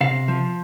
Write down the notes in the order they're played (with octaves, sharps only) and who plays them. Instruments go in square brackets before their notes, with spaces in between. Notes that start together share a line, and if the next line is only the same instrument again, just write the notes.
[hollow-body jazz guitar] C3 F5
F3